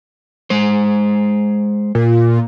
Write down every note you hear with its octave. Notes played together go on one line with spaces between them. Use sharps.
G#3 C5
A#2